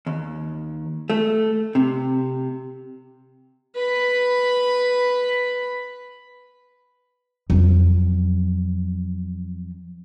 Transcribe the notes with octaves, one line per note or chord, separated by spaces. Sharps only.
D#2
A3
C3
B4 B5
F2 F#3